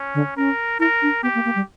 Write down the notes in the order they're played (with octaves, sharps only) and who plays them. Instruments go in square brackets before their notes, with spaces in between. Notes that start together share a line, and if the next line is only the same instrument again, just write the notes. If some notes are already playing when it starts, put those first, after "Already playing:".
Already playing: [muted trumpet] C#4
[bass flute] D3
[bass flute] C#4 [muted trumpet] A#4
[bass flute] E4 [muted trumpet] A#4
[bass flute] D4
[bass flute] B3 [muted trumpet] G4
[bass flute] A#3
A#3
G3